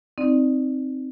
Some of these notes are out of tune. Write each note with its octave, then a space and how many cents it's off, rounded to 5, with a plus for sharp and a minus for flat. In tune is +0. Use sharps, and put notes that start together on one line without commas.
C4 +0 D#4 +0 D5 +25